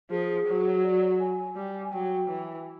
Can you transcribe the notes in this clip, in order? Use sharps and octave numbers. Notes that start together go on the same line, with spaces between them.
F3 G#4
F#3
D5
G#5
G3
G#5
F#3 G5
E3